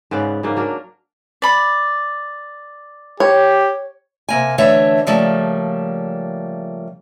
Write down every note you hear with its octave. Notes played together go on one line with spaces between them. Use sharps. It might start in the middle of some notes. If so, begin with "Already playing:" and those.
G#2 C#3 B3 D5
G#2 C#3 A#3
F#3 D4 A#4
D5 B5
G4 C#5
C3 A#3 G#5
D3 E3 A3 C#5 E5 F#5
C#3 F3 G3 A3 A#3